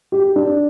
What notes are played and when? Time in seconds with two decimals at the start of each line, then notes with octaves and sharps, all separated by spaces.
0.12 G4
0.36 D4